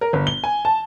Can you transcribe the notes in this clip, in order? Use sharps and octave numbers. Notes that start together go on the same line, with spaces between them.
A#4
G1
G7
G#5
A5